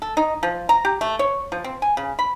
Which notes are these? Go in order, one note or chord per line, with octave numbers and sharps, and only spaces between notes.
A4
D#4
F3
A#5
G4
A3
C#5
F3
C4
G#5
C#3
B5